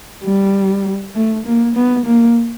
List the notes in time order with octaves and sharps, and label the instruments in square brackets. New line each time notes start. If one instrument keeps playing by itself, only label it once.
[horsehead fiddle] G3
A3
A#3
B3
A#3